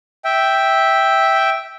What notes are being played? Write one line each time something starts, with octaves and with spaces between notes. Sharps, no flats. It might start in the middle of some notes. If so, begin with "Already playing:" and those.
E5 G5